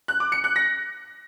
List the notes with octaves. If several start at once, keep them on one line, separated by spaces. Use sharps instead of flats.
F#6
D6
C#7
F#6
A#6